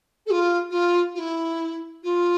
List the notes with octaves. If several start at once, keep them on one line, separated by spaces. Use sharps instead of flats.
A4
F4
F4
F4
E4
F4